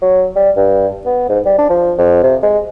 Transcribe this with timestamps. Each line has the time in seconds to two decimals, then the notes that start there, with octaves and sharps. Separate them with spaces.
0.02 F#3
0.36 G3
0.56 G2
1.05 B3
1.29 G#2
1.46 G3
1.59 D4
1.70 F3
1.98 F2
2.23 C3
2.43 G#3